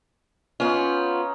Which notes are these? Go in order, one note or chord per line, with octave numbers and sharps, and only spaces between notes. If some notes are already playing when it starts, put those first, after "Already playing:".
B3 C#4 D#4 F4